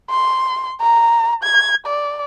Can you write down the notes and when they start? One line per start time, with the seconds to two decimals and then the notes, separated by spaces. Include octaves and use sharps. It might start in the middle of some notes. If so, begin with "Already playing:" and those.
0.10 C6
0.81 A#5
1.43 G#6
1.86 D5